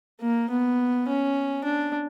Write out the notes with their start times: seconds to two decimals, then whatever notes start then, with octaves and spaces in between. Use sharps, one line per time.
0.21 A#3
0.50 B3
1.08 C#4
1.65 D4